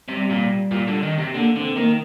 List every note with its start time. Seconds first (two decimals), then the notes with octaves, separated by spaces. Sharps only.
0.08 C3 G3
0.30 A#2
0.71 A#2
0.88 D3
1.03 D#3
1.18 C3
1.35 D3 A#3
1.56 D3 C4
1.76 D#3 A#3